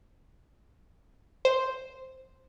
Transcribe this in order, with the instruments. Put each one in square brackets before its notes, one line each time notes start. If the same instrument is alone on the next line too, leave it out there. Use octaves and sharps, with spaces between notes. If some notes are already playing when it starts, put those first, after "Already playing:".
[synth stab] C5